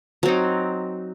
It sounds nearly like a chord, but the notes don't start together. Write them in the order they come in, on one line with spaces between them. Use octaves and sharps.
F#3 C4 D#4